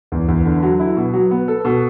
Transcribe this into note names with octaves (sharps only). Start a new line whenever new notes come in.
E2
E2
D3
F#3
E4
B2
F#3
B3
A4
B2